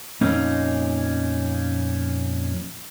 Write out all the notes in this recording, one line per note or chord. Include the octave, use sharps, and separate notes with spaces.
F2 A#2 A#3 C#4 D#4